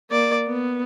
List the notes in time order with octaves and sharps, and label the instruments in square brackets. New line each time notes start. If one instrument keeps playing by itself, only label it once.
[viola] A#3 D5
B3